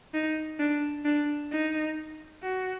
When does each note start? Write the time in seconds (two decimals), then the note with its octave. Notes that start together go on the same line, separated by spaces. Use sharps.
0.14 D#4
0.59 D4
1.05 D4
1.51 D#4
2.43 F#4